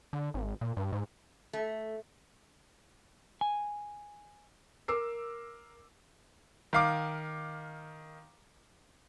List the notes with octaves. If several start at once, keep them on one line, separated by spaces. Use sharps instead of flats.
D3
G#1
A#2
G2
G#2
A3
G#5
A#4 D6 E6 C7
D#3 F5 D6